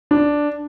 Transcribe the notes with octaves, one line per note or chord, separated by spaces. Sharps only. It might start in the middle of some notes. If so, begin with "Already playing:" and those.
D4